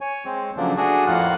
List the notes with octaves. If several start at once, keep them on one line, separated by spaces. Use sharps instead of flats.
C#5 G#5
G#3 C4
C#3 F3 F#3 A3 A#3 D4
A3 D4 F#4 G#4
F2 A2 A#3 F4 F#5 F#6